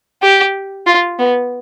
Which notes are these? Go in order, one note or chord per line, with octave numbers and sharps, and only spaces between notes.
G4
F4
B3